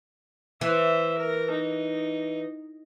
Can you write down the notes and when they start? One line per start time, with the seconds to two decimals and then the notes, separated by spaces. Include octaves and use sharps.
0.61 E3 C5 E5
1.18 A#4
1.50 D#4